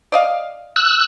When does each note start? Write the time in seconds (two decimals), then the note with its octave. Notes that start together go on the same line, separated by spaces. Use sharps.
0.12 D5 D#5 F5
0.76 E6 F#6